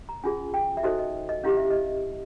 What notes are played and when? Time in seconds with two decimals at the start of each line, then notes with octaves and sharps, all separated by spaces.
0.09 A#5
0.24 C#4 F4 G#4 G#5
0.54 G5
0.77 E5
0.83 D#4 F#4 A4 C5 D#5
0.99 D#5
1.29 D#5
1.44 C#4 E4 G4 F5
1.57 E5
1.71 D#5